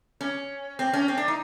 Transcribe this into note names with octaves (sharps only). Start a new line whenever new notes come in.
C#4
C4
C#4
C4
D4
D#4